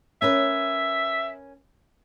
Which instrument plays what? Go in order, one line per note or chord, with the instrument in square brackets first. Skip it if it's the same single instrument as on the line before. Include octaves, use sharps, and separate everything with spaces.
[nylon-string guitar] C#4 A#4 B4 [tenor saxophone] E5